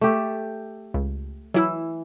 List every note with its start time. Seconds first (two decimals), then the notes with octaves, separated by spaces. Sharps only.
0.01 A3 G4 A4
0.94 C#2
1.54 E3 F#3 E4 E6